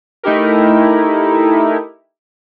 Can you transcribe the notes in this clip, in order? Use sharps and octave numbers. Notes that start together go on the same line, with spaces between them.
A3 D#4 E4 G4 A#4